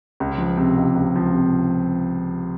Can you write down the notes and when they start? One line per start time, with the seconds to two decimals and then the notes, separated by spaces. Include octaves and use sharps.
0.20 C#2
0.38 F3
0.57 C3
0.77 C#2
0.96 C#2
1.15 F3
1.34 C3